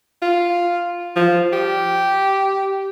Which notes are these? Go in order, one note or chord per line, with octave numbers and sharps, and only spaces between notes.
F4
F3
G4